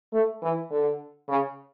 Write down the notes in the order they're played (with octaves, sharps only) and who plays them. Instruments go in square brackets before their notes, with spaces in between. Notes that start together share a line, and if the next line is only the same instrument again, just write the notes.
[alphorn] A3
E3
D3
C#3